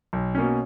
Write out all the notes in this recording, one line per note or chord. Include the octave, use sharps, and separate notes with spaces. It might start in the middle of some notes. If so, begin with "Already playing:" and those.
B1
B2 A#3 C#4